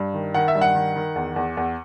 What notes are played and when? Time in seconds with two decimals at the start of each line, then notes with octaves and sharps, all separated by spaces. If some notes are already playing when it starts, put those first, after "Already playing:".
Already playing: G2
0.14 D#3
0.34 D#3 F#5
0.48 E5
0.55 G2
0.61 F#5
0.75 D#3
0.96 D#3
1.16 E2
1.36 E2
1.57 E2